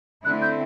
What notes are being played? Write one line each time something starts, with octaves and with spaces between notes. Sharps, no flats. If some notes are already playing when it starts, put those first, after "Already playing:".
D3 A3 C4 E4 F#6
G6